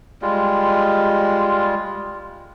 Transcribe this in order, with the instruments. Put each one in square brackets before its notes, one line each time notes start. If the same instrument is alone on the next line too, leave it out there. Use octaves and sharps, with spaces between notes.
[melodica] G3 G#3 F4